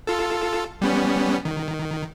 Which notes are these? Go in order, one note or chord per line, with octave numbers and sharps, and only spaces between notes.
F4 A4
G3 B3 C#4
D#3